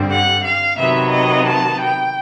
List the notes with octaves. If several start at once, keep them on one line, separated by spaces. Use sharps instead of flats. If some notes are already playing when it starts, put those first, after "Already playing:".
Already playing: G2 D3 G3 C4
F#5
F5
C3 D#3 F#3 B3 E5
D#5
A5
G5